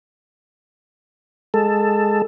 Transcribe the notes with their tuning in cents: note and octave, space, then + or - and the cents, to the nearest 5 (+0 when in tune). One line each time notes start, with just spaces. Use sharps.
G#3 +0 A4 +10